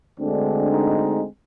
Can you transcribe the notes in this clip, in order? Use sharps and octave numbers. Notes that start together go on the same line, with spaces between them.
D2 D3 G#3 C4 D4
D#4